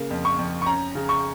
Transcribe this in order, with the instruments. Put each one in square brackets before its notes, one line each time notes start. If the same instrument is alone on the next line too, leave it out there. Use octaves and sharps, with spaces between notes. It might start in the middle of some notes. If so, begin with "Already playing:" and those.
Already playing: [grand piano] C#3 A#3
F2
C#6
F2
C#6
C#4 A#5
C#3
C#6